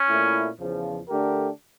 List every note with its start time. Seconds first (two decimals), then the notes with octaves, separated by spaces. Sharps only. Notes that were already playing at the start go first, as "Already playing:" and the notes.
Already playing: C#4
0.09 A#2 A3 E4
0.59 E2 C#3 F3
1.08 D3 A3 D4 G4 A#4